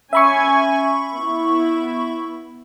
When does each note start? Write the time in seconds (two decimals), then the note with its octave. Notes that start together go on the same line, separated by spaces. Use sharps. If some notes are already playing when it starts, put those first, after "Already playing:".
0.13 C#4 E5 G#5 B5 C#6
1.15 B3 E4